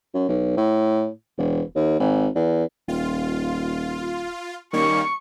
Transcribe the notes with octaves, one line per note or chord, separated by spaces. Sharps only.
F#2
B1
A2
E1
D#2
G#1
E2
D#1 F4
D#3 G3 A#3 C#4 C#6